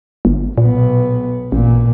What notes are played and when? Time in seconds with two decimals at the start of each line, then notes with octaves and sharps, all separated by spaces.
0.25 G1
0.58 B1 A#2 B3
1.52 A1 A#2